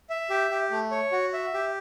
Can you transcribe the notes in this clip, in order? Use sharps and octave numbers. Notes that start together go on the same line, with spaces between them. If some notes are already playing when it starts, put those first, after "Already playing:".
E5
G4
G4
A3
C#5
F#4
E5
G4